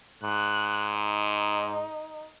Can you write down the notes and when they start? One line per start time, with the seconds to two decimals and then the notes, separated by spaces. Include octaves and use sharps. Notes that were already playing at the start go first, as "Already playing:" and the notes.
0.24 G#2 F#6
0.99 D#4